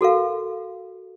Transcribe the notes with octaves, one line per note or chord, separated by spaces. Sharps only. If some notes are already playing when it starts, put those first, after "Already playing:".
F#4 A4 A#4 F5